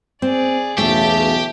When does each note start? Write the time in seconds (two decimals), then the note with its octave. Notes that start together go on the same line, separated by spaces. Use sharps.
0.22 C4 G#4 D5
0.78 B1 E2 C#3 A3 G4 E5 A5